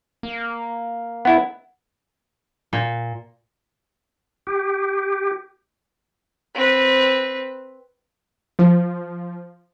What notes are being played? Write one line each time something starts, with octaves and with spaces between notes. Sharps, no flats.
A#3
B3 E4 F#5
A#2
G4
C4 B4
F3